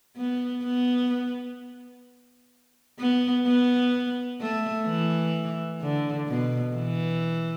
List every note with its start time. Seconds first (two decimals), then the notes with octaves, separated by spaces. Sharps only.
0.17 B3
0.64 B3
2.99 B3
3.46 B3
4.41 A3
4.87 E3
5.82 D3
6.28 B2
6.76 E3